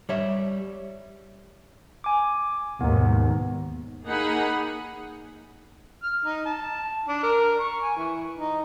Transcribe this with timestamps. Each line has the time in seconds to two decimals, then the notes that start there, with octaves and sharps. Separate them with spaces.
0.09 G3 C#5 E5
2.04 G#5 D6
2.81 D#2 G#2 B2 B3 D#4
4.05 A#3 D#4 G#4 F#5 G#5 B5
6.03 F6
6.25 D#4
6.46 A5
7.09 D4
7.23 A#4
7.60 C#6
7.83 G#5
7.97 E3
8.37 D#4